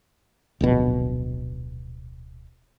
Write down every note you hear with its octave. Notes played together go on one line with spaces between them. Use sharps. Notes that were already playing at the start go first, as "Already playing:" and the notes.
D1 A#1 B2